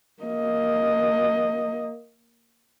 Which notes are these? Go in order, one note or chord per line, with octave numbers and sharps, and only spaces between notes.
A#3 D#5